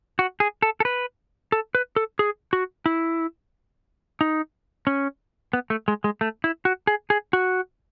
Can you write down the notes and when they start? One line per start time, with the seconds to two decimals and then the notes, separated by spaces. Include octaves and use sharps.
0.19 F#4
0.40 G#4
0.62 A4
0.80 A4
0.85 B4
1.52 A4
1.75 B4
1.96 A4
2.19 G#4
2.53 F#4
2.86 E4
4.21 D#4
4.87 C#4
5.53 B3
5.70 A3
5.88 G#3
6.04 G#3
6.21 A3
6.44 E4
6.65 F#4
6.87 G#4
7.10 G#4
7.33 F#4